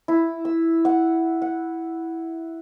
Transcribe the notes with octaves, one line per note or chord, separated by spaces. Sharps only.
E4
E6
F#5
F#5